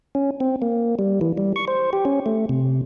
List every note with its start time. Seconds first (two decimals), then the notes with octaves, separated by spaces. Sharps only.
0.15 C#4
0.40 C4
0.62 A#3
0.99 G3
1.21 E3
1.37 G3
1.56 C#6
1.68 C5
1.93 G4
2.05 C#4
2.26 A3
2.49 C3